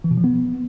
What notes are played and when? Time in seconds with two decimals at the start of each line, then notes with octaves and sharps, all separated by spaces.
0.04 E3
0.11 B2
0.17 F3
0.24 B3